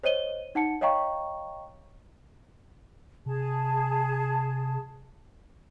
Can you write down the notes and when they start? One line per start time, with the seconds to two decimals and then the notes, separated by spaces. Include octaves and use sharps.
0.04 C5 C#5 D#5 D#7 G7
0.55 D#4 F#5 A5 C#7
0.81 C#5 D#5 F5 G5 A#5 C#6
3.26 C3 G#4 A5